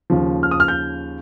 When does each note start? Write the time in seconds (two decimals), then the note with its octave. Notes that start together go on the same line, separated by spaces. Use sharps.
0.10 D#2 C#3 F3
0.43 F6
0.51 D#6
0.60 F6
0.68 G6